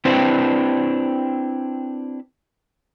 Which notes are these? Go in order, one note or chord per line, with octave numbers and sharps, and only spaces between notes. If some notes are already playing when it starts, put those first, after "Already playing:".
C4 D4 E4 G4 B4 C5